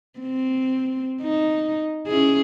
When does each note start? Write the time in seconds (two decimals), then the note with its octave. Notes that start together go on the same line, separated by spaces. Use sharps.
0.19 C4
1.22 D#4
2.07 C#4 E4 G#4